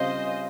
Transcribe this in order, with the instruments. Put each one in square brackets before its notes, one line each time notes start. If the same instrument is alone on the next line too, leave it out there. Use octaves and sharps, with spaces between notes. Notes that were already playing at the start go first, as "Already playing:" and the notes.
Already playing: [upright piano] C#3 G3 C4 F4 [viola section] C5 D#5